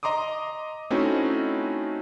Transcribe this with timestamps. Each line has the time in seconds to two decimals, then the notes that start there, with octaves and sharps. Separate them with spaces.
0.03 D#5 A#5 C6 D6 D#6
0.90 A3 C4 C#4 D#4 E4 F#4